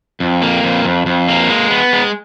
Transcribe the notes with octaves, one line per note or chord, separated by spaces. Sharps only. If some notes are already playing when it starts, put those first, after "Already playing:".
F2
A#3
F2
F2
F2
A#3
G#3
B3
G#3